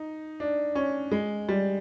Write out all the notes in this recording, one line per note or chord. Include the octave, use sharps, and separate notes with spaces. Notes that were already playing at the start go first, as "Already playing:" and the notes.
Already playing: D#4
D4
C#4
G#3
G3